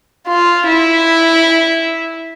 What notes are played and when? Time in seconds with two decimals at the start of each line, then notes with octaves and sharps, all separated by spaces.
0.28 F4
0.68 E4